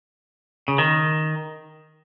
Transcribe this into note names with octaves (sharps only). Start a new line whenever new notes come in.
C#3
D#3